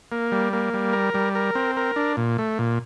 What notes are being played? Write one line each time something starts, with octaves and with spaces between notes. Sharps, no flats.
A#3
G3
A#3
G3
A#4
G3
A#4
C4
A#4
D4
A#2
A3
A#2